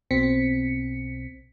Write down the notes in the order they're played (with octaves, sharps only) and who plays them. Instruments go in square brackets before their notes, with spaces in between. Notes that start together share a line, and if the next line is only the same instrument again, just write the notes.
[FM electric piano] B1 B2 C4 B6 C#7